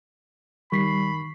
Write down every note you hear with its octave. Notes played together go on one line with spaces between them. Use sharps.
D#3 G3 B5 C#6 B6 C7